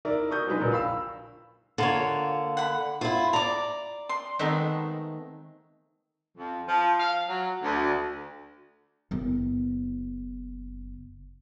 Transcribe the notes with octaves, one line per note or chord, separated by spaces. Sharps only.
D#4 E4 A#4 D5
A#4 C#6 D#6 G6
F3 F#3 G#3 D4 D#4 B4
A#1 A#2 A#4
F5 B5 E6
D3 A#3 F4 C#5
F#5 B5
E4 F4 C5
D5 A#5 D6
C6
D#3 G#3 A3 B3 C4 D#4
F2
F3
F5
F#3
D2
F#1 B3